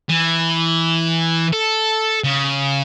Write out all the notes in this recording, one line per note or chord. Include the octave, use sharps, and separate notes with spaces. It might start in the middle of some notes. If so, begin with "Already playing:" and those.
E3
A4
C#3